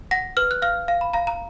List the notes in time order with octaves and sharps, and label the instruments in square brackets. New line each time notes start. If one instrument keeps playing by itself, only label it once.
[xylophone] F#5 A#6
B4 F6
F#6
F5 F6
F5
B5
F5 A#5
A#5